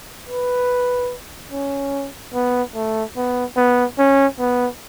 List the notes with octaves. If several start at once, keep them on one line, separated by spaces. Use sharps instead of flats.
B4
C#4
B3
A3
B3
B3
C#4
B3